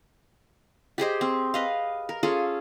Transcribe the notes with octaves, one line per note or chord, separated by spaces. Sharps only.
G4 G#4 C5 D#5
C4
B4 D#5 F5
A#4
C#4 F4 G#4 A4